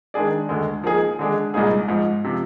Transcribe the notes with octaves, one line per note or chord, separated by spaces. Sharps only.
D#3 G#3 D4 G#4 D5
D2 D3 G#3
F3 A#3 D#4 G#4
D3 G#3 D4 G#4
C2 A#2 G#3 D#4 G#4
G#2 F3 G#3
C3 F3